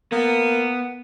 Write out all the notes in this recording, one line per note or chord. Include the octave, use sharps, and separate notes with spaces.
A#3 B3